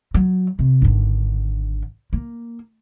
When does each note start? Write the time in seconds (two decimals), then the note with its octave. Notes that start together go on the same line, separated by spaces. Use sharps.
0.14 F#3
0.59 C3
0.82 G#1 D3
2.13 A#3